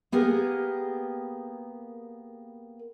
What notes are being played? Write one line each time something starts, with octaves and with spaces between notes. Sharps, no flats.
A#3 B3 G4 G#4 A#4